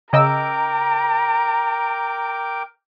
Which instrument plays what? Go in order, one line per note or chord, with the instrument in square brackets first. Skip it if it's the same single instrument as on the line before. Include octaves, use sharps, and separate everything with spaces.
[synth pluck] C#3 D#5 E6 [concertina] A#4 G5 D6 [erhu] A#5